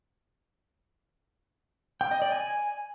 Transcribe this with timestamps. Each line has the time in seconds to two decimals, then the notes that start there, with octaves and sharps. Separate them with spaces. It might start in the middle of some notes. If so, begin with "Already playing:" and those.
2.01 G5
2.11 D#5
2.22 D5
2.32 G#5